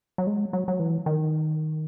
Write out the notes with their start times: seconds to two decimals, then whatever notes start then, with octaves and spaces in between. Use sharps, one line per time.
0.18 F#3
0.27 G#3
0.53 F#3
0.68 F#3
0.79 E3
1.06 D#3